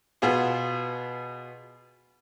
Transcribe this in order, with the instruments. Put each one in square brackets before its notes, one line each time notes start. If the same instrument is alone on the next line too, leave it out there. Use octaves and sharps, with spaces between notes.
[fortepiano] B2 B3 F4 G#4